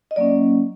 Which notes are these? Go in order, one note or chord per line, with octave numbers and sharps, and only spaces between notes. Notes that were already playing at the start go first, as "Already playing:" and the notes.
D#5
F#3 A#3 C#4 D5